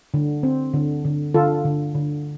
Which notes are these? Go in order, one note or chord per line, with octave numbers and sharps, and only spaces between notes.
D3
C4
D3
D3
D3 F4 A4
D3
D3